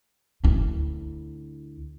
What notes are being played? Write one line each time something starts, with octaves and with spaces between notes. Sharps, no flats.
D2 E4